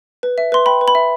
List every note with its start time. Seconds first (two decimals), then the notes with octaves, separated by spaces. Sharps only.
0.23 B4
0.38 E5
0.52 B4 C6
0.66 G5 B5
0.81 B4
0.88 B5
0.95 E5